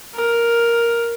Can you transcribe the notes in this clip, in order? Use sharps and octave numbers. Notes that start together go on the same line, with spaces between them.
A#4